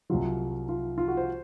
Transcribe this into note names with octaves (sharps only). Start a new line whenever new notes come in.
C2 C3 F#3 F4
F4
F4
F#4
C5